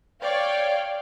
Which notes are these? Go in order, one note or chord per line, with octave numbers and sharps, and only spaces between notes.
C#5 D5 F5 G5